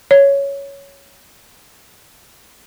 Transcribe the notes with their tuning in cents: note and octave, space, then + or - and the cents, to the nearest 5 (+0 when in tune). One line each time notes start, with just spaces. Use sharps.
C#5 +5